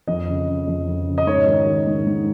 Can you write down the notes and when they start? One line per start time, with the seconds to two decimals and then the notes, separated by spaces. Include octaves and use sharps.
0.08 F2 D#5
0.28 C#3
0.48 C#3
0.68 F2
0.87 F2
1.07 C#3
1.18 D#5
1.27 G#2 C#5
1.47 D#3
1.67 D#3
1.87 G#2
2.07 G#2